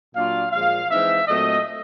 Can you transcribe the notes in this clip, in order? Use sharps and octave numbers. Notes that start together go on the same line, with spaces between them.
A#2 F#3 A#3 D4 F4 F5
A#2 F3 G#3 F5
E3 G#3 C4 D#4 E5
A#2 F#3 A3 C4 D#5